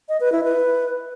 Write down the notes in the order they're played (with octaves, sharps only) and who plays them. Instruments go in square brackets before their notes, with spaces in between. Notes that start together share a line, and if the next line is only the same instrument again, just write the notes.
[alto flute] D#5
B4
E4
B4